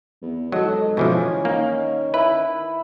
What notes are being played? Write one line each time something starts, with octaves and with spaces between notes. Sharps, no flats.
E2
G#2 F#3 A4 D#5
B2 E3 F3 C#4 G#5
D#3 A#3
E4 B4